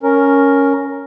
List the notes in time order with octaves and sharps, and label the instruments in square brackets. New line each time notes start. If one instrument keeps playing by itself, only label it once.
[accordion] C#4 A#4